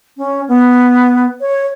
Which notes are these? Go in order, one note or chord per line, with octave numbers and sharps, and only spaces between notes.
C#4
B3
C#5